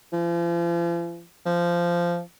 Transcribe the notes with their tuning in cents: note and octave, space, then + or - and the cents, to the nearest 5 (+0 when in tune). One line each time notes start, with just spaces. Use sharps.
F3 -40
F3 -15